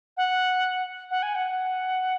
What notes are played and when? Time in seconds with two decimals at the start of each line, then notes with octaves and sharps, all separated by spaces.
0.17 F#5
1.11 F#5
1.22 G#5
1.35 F#5